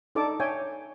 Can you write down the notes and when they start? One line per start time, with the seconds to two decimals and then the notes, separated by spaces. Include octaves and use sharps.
0.15 D4 D#4 A4 D5 A5 D6
0.40 C#5 E5 G5 G#5